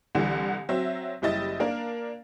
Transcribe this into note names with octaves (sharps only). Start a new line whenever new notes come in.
C2 D3 E3 G3
F#3 C4 E5
F#1 G3 E4 D#5 A6
A#3 D4 A#4 F5